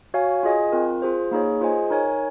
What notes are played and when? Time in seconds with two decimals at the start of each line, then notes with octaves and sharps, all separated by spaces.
0.14 F#4 C#5 F5 G#5
0.43 F4 G#4 D#5 G#5
0.72 C4 F4 A#4
1.02 F4 G#4 C5
1.31 A#3 D#4 G#4 C#5
1.61 F4 G#4 C5 D#5 G#5
1.90 D#4 A#4 C#5 G#5